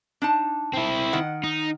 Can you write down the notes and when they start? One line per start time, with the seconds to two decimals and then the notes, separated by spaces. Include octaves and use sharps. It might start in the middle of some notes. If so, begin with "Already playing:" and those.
0.22 D4 D#4 A5
0.73 C4 E4
1.13 D#3 F#5
1.44 D#4